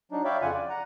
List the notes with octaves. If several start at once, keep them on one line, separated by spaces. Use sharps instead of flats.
F#3 D4 D#4
C#5 D5 E5 F5 G5 B5
F2 C#3 F4 F#5 G#5
D5
F#5 A#5